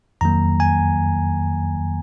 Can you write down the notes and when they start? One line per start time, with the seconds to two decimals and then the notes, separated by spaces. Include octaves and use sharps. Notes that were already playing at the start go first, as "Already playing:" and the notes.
0.21 F2 D#3 F#3 A#3 A#5
0.60 G#5